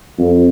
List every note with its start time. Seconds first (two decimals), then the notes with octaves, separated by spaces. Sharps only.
0.19 F2